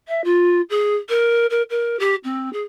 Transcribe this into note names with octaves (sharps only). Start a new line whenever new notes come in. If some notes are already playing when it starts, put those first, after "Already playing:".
E5
F4
G#4
A#4
A#4
A#4
G4
C4
G#4